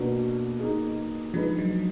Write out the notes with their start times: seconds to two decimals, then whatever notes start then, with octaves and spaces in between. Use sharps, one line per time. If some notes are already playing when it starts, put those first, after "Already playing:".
Already playing: B2 A#3 D4 F#4
0.60 A#3 D#4 G#4
1.34 D3 F3 G#3 D#4 G#4 B4
1.59 F#3